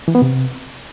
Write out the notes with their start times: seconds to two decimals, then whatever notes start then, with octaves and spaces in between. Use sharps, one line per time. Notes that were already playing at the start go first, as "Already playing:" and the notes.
0.08 E3
0.15 B3
0.22 C3